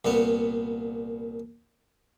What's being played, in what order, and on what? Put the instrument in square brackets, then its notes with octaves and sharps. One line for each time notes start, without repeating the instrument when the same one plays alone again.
[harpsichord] C2 A#2 B3